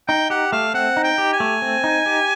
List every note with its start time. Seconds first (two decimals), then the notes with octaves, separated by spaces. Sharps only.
0.08 D#4 G5
0.30 G4 F#5
0.52 A3 F5
0.74 C4 F#5
0.97 D#4
1.04 G5
1.18 G4
1.33 G#5
1.40 A3
1.62 C4
1.84 D#4
2.06 G4